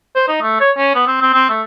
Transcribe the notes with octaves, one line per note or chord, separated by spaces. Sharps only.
C5
D#4
A3
C#5
C#4
B3
C4
C4
C4
A3